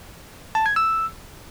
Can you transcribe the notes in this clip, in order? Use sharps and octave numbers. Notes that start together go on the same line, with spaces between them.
A5
G#6
E6